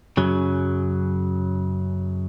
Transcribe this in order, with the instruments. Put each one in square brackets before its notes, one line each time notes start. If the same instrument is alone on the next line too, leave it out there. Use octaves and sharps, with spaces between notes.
[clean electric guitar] F#2 C#3 F#3